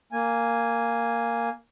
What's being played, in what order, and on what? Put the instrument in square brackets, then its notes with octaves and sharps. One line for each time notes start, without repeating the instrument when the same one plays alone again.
[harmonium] A#3 G#5